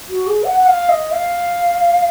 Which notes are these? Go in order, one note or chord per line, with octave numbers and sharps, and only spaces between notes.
F#4
G#4
F#5
F#5
F5
D#5
F5